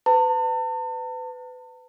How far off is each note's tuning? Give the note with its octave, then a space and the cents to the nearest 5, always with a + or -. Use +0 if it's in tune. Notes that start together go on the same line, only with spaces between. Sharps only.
B4 +30 A5 +40